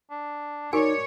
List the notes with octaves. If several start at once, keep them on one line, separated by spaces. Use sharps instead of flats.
D4
D#4 F#4 A#4 C#5 D5 G#5